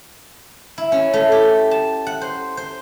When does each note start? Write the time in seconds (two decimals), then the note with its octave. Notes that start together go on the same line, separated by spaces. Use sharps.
0.78 E4
0.92 C#4
1.13 A3
1.32 G4
1.71 A5
2.07 F#5
2.21 C5
2.57 C5